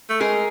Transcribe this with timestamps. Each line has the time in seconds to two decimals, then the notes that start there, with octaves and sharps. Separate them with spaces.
0.09 A3
0.20 G#3 G#4 A#4